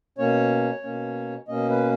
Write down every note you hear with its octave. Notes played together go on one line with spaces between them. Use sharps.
B2 A#3 C#4 C#5
B2 A#3 C#4
B2 A#3 C#4 D#5
B4